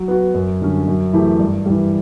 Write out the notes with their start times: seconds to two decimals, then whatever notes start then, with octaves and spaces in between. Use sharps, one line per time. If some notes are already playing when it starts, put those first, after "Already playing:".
Already playing: F#3
0.08 B3 F#4
0.34 F#2
0.61 D3 G3 C#4
0.88 F#2
1.13 E3 A3 E4 G4
1.39 G2
1.66 E3 G3